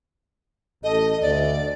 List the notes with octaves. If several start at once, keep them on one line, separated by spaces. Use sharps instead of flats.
A1 A4 D#5
D2 D5